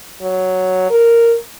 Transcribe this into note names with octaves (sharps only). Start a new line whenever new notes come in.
F#3
A#4